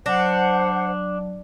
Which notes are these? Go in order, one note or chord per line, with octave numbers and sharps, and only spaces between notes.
F#3 D4 C5 F#5 A5